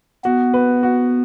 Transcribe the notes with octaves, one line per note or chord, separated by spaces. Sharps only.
B3 F#4
B4
F#4